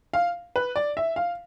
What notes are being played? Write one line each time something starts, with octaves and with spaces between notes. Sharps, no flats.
F5
B4
D5
E5
F5